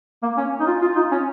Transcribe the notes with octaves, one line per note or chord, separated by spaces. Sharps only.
A#3
C#4
D#4
F4
F4
D#4
C#4